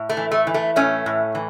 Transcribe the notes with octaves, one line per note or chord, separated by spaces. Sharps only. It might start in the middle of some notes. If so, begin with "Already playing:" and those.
Already playing: A2
A3
E3
A3
E3
A3
A2 A3 C#4
A2
E3